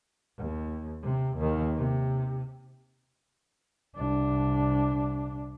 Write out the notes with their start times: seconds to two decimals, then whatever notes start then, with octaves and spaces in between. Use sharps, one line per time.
0.38 D#2
1.03 C3
1.37 D#2 D#3
1.77 C3
3.96 C2 D4